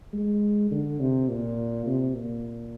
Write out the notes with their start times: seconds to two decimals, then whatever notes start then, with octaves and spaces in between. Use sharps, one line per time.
0.13 G#3
0.71 D3
1.00 C3
1.29 A#2
1.86 C3
2.14 A#2